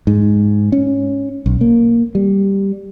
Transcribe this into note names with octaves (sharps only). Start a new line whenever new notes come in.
G#2
C#4
B1
A#3
G3